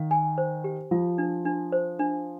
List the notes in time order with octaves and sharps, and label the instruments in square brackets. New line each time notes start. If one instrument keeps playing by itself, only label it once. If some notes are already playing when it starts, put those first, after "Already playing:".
Already playing: [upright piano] D#3 [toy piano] F5
[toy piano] G#5
C5
G4
[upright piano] F3 [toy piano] F4
[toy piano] D4
D4
C5
D4